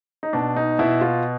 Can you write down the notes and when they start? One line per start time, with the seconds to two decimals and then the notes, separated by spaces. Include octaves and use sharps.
0.23 D#4
0.33 B2 D4
0.56 D#4
0.79 B2 E4
1.01 F4